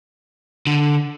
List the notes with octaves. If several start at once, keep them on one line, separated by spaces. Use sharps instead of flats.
D3